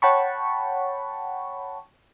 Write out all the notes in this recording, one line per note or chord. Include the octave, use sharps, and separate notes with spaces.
C#5 F#5 G5 A5 B5 C#6